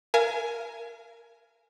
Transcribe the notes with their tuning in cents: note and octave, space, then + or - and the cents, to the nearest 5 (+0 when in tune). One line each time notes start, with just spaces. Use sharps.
A#4 +0 F5 -45 G#5 +15